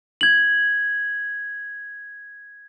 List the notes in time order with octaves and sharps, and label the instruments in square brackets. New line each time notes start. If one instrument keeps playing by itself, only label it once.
[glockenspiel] G#6 F#7